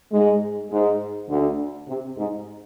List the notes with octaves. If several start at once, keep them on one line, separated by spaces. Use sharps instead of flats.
G#2 G#3
G#2 G#3
D2 D3
C3
G#2